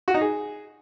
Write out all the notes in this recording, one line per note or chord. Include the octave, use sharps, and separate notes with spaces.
F#4
D#4
G#4